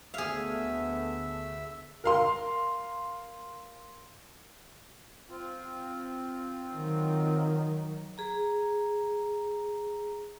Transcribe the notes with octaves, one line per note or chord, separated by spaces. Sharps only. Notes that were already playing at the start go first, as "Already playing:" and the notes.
D2 A3 B3 G#4 E5 F5
A#4 F5 C6
C4 F4
D#3 F#3
G#4 A#5